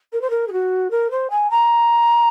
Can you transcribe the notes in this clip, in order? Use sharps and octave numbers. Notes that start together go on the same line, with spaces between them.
A#4
C5
A#4
G#4
F#4
A#4
C5
G#5
A#5